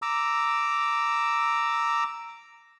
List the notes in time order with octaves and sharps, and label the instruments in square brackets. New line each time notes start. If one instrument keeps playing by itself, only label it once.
[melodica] A#5 D6 E6